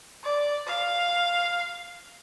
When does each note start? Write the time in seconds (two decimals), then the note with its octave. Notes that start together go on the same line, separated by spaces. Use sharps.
0.24 D5
0.67 F5